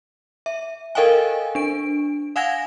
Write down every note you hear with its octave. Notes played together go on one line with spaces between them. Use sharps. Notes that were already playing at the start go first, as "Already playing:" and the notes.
E5
A4 A#4 D#5 F5 G5 G#5
D4 D7
F5 F#5 G#5 G#6 A#6